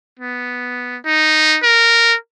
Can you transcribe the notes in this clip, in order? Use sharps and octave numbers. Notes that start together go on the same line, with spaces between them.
B3
D#4
A#4